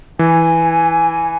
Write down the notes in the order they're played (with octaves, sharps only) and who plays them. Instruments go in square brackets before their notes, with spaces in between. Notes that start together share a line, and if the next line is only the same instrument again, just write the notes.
[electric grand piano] E3 [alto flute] G#5